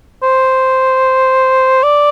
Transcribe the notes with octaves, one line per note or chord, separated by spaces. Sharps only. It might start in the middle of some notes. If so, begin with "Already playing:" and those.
C5
D5